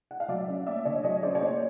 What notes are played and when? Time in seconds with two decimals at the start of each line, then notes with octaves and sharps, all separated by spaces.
0.11 F#5
0.20 F5
0.28 F#3 D5 E5
0.48 C#4
0.67 A#3 D5 E5
0.85 D3 C#5 D#5
1.03 F#3 C#5 D#5
1.23 C#4 C5 D5
1.35 C#5
1.41 A#3 C5 D5